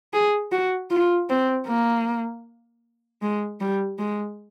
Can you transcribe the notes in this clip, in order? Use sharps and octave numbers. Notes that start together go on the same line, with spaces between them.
G#4
F#4
F4
C4
A#3
G#3
G3
G#3